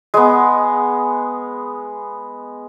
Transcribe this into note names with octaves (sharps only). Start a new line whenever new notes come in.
G#3 B3